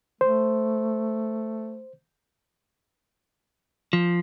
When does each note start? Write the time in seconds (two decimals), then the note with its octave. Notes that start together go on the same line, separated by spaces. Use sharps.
0.21 A3 C5
3.93 F3